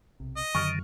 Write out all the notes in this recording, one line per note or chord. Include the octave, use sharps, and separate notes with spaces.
B1 C3
D#5
F#2 D3 D#3 C#6 F6